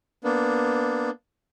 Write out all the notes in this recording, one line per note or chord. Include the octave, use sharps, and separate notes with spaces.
A#3 B3 D4